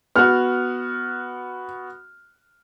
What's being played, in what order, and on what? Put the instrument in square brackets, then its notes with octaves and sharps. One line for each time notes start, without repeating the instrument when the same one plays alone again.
[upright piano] B3 F#4 [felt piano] F6